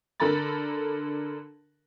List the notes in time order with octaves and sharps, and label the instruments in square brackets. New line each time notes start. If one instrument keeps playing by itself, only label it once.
[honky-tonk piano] D3 A4 A#4 B5 A6